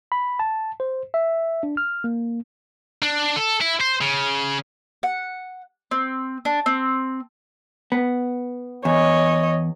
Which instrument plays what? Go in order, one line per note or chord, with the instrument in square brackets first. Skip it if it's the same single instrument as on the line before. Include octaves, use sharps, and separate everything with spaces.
[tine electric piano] B5
A5
C5
E5
D4
F6
A#3
[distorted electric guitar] D4
A4
E4
C5
C#3
[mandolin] F#5
C4
D4
C4
[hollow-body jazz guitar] B3
[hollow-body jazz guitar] E2 [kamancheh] C#5 D#5